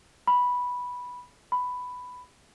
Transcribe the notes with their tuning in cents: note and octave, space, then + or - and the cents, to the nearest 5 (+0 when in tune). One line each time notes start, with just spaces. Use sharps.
B5 -5
B5 +10